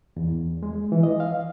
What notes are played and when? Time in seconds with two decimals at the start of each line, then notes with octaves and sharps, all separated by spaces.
0.17 E2
0.63 G#3
0.92 E3
1.03 D#5
1.20 F5